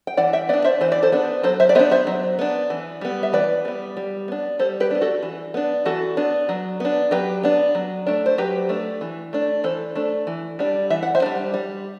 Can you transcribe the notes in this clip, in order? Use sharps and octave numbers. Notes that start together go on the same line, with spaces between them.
G5
E3 D5 F#5
E5 G5
B3 D4 D5 F#5
C5 E5
E3 C5
D5
A4 C5
B3 D4
F#3 A4 C5
C5 E5
D5
B3 D4 C5 E5
C5 E5
F#3
B3 D4
E3
G3 B3
E5
E3 B4 D5
G3 B3
G3
B3 D4
G3 A4 C5
G4 B4
B3 D4
F#4 A4
E3
B3 D4
E3 F#4 A4
B3 D4
F#3
B3 D4
F#3 G4 B4
B3 D4
F#3
A3 D4
C5
F#3 G4 B4
A3 D4
E3
A3 D4
E3 A4 C5
A3 D4
E3
G3 D4
E3 E5
F#5
C5 E5
G3 D4
G3